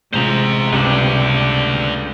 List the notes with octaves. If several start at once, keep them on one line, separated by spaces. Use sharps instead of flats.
A1 C3 G#3 F4 C5 A#5
C#2 G2 A3 D4 G4